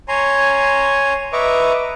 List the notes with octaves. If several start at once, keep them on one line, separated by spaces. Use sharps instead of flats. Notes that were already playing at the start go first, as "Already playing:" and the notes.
C#5 G#5 A#5 C6
B4 D#5 E5 A#5 C#6 D6